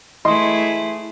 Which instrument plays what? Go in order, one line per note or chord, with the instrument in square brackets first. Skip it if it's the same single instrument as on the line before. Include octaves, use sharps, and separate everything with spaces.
[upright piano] E3 D#5 C6 [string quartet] A3 E4 G#4